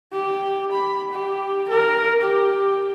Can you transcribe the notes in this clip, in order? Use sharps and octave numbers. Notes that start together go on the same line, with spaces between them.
G4
B5
G4
A#4
G4